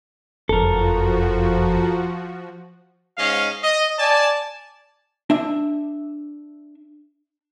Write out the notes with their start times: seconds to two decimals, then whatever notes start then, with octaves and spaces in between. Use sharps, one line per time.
0.49 F#1 F2 F3 F#4 A4 A#4
3.18 G#2 C#4 D#5 F5
3.63 D#5
3.99 D5 G#5 A5
5.30 D4 E5